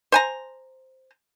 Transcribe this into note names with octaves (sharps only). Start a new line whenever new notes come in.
C5 G#5 A#5